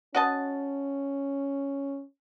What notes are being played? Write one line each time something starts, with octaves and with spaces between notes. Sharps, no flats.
C#4 F#4 D#5 A5